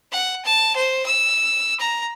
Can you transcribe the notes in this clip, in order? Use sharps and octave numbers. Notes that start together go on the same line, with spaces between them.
F#5
A5
C5
E6
A#5